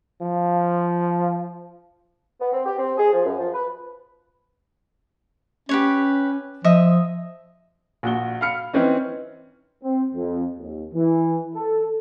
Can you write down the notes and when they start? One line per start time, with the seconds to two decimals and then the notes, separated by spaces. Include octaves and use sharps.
0.21 F3
2.40 B3
2.53 C4
2.66 G4
2.78 C4
2.98 G#4
3.12 F3
3.25 F#2
3.38 F3
3.53 B4
5.69 C#4 G4 B4 C#5
6.64 F3 D#5 E5 D#6
8.03 A#1 F#4 G7
8.41 F5 B5 F6 C#7
8.73 E3 C4 C#4 D#4
9.83 C4
10.14 F2
10.58 D#2
10.94 E3
11.54 A4